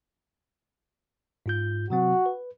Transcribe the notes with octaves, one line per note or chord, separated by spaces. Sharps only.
G#2 F4 G6
C3 F#3 C4 F#4
B4